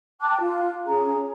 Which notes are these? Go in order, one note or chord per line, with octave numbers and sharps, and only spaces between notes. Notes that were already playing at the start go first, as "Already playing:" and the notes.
G5 A5 D6 F#6
F4
C#4 G#4 A#5